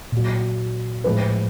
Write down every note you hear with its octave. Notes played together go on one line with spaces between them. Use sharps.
A#2 F#3
A2 F3 G#3 B4